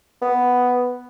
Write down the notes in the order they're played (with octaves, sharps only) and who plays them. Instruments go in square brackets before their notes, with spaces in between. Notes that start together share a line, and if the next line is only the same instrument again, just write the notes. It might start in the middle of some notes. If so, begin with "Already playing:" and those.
[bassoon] B3